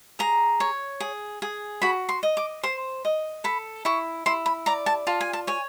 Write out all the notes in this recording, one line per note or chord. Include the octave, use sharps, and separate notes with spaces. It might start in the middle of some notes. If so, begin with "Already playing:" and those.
G#4 A#5
C#5
G#4
G#4
F#4 B5
C6
D#5
D6
C5 C6
D#5
A4 B5
E4 C#6
E4 C6
B5
D5 A#5
A5
F4 A5
G#5
A5
C#5 G#5